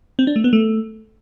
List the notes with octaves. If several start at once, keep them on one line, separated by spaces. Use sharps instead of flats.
C4
D4
A3
B3
A3